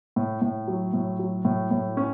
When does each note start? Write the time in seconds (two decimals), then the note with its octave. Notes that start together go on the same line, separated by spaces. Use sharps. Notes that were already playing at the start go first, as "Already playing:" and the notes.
0.16 A2
0.42 A2
0.68 F#3
0.93 A2
1.19 F#3
1.45 A2
1.71 A2
1.97 C#4